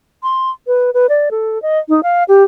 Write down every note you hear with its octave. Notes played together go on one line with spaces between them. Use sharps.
C6
B4
B4
D5
A4
D#5
D#4
F5
G4